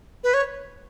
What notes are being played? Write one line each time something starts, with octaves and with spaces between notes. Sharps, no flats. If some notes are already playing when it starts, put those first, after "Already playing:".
B4
C#5